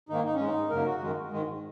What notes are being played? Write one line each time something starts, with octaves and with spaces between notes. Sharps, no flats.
G#2 D#3 A#3 D#4
D#4
G#2 G#3 C#4
D#4
F#2 C#3 F#3 A#3 A#4
F#4
F#2 D#3 G#3
G#2 D#3 G#3